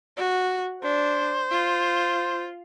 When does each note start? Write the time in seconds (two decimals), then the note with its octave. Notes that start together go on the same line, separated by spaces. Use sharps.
0.17 F#4
0.82 D4 C5
1.51 F4